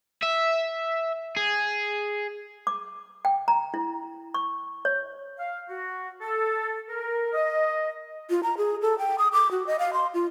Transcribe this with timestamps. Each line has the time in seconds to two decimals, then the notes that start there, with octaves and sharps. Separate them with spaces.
0.22 E5
1.36 G#4
2.67 D6
3.25 G5
3.48 A#5
3.74 E4
4.34 C#6
4.85 C#5
5.38 F5
5.70 F#4
6.22 A4
6.89 A#4
7.34 D#5
8.30 F4
8.43 A#5
8.57 G#4
8.82 A4
8.99 G5
9.18 D#6
9.33 D6
9.51 F#4
9.67 D#5
9.79 F5
9.93 C6
10.14 F4